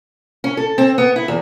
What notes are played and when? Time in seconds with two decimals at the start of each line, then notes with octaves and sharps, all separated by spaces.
0.44 C#4
0.57 A4
0.78 C4
0.98 B3
1.16 E4
1.28 E2